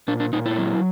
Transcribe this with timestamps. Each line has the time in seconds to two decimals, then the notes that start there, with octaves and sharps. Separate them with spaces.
0.08 A#2 D4
0.20 D4
0.33 A#2 D#4
0.46 E4
0.58 F#3